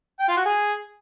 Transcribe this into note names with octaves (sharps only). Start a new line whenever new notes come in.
G5
F4
F#4
G#4